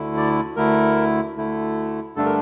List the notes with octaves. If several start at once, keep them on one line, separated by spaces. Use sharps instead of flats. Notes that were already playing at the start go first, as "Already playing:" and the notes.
Already playing: D2 D3 A3 E4
D5
D2 D3 A3 E4 A#4
D2 D3 A3 E4
G2 D3 A3 D4 A4
A#4